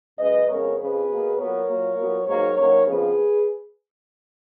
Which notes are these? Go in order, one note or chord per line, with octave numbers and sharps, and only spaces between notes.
F#2 C#3 G#3 B4 D#5
F2 C#3 G#3 B3 A#4 C#5
F2 C#3 F3 G#4 B4
B2 A#3
A#2 F#3 B3 A#4 C#5
A#2 F#3 A#3
A#2 F#3 B3
G#2 F#3 A#3 A#4 C#5
F#2 D#3 F#3 A#3 A#4 C#5
F2 C#3 F3 B3 G#4 B4